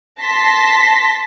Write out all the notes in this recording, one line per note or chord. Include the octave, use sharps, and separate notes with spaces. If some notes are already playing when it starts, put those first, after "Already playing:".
A5 C6 A#6 B6